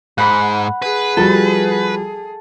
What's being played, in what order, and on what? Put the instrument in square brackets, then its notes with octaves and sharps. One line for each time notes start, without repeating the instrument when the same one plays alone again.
[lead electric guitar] G#2 [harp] F#5 B5
[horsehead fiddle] G#4 [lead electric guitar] B4
[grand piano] F3 G3 F#4 [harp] A4 A5